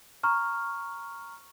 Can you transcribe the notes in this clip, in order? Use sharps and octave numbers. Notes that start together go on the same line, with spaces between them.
A#5 C#6 F6